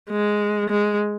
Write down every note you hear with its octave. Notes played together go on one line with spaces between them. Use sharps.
G#3
G#3